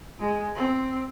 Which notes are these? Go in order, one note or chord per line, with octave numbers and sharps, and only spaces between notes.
G#3
C4